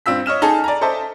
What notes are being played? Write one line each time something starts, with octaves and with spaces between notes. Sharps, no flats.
G2 C4 F4 E6 B6
C#5 D#5 F6 E7
D#4 G#4 A4 A5
D5 G#5 A#5
A4 C5 D#5 E5 A5 D6